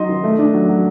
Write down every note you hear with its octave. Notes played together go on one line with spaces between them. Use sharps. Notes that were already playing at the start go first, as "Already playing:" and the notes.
Already playing: F#3 D#4 D#5 C6
D#3
A3
D4
F#3
F#3